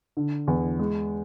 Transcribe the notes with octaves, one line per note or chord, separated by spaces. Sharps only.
D3
E2
G#3